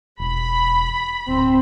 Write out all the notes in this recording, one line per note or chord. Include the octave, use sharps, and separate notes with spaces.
E1 B5
D1 C4